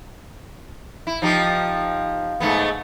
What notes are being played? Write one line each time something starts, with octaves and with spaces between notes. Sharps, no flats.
E4
F3 D#4 G4
G#2 A3 B3